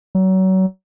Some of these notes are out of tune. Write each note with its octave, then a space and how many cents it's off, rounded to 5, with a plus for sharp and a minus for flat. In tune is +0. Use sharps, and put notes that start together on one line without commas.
F#3 +30